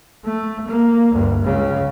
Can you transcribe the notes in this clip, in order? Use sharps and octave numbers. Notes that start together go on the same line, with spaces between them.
A3
A#3
D2 G2
C#2 C#3